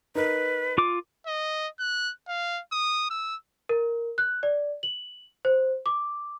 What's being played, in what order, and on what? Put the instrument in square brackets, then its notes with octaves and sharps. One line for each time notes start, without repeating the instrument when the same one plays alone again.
[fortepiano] D#4 A#4 [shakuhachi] B4
[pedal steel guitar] F4 D6
[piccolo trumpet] D#5
F#6
F5
D#6
E6
[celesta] A#4
F#6
D5
F#7
C5
D6